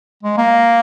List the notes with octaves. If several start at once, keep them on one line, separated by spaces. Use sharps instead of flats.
G#3
A#3